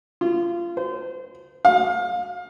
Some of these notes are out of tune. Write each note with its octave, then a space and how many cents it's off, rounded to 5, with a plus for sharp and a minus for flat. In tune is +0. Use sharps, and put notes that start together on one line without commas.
F4 -25
C5 -30
F5 +25